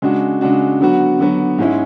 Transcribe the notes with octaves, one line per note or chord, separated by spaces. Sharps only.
C#3 G#3 D4 F#4
C#3 G#3 D4 F#4
D3 F#3 B3 F#4
D3 F#3 B3 F#4
G#2 G#3 C#4 E4